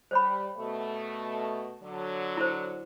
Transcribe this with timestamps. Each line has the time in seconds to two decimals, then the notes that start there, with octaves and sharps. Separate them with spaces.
0.11 G3 C5 C#5 B5
0.56 B2 A3
1.81 D3 F#3
2.37 E4 C5